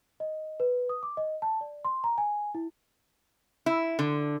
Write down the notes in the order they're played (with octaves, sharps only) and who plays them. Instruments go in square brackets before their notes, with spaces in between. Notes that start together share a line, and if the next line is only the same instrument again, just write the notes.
[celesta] D#5
B4
D#6
D6
D#5
A5
D5
C6
A#5
G#5
E4
[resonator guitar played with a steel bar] E4
D3